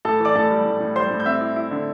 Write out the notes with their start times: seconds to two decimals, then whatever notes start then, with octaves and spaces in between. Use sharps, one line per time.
0.05 A2 A4 A5
0.20 E3
0.25 D5 D6
0.35 A2 A4 A5
0.51 G3
0.66 A2
0.80 A2
0.96 G3 C5 C6
1.11 A2
1.20 G6
1.26 C4 E5 E6
1.41 E4
1.56 E4
1.71 D3